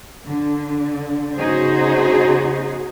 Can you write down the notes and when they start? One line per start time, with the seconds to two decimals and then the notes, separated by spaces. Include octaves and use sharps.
0.25 D3
1.37 C#3 B3 D#4 F#4 G#4 C5